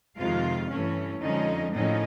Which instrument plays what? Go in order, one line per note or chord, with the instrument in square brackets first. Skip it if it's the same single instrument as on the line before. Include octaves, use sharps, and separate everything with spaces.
[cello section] F2 C3 D#3 G#3 F4 F5
G2 E3 A3 C#4
F2 D3 F3 G#3 C#4 D#4 D#5
A2 F3 A#3 C#4 D#4 D#5